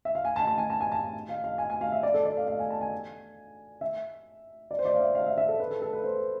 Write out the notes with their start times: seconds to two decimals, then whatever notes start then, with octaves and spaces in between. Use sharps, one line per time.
0.05 E5
0.15 F5
0.25 G#5
0.36 A5
0.47 A5
0.58 G#5
0.70 A5
0.81 G#5
0.92 A5
1.29 F5
1.44 F5
1.58 G#5
1.70 G#5
1.81 F5
1.92 E5
2.03 D5
2.14 A4
2.25 D5
2.37 F5
2.48 F5
2.59 G#5
2.70 A5
2.81 G#5
3.81 E5
4.71 D5
4.79 C5
4.85 D5
4.94 F5
5.00 E5
5.15 F5
5.26 E5
5.38 E5
5.48 A4
5.60 B4
5.70 A4
5.82 A4
5.93 B4
6.04 C5